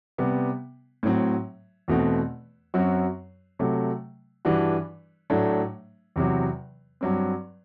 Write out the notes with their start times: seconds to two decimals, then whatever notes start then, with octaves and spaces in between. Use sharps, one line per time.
0.18 C3 G3 B3
1.03 A2 F#3 C4
1.88 E2 B2 A3 C4 F#4
2.74 F#2 F#3 C4 F#4
3.59 C3 F#3 A3
4.45 G2 E3 G3 D4 F#4
5.30 A2 F#3 A3 D4
6.16 E2 C3 F#3
7.01 G2 F#3 C4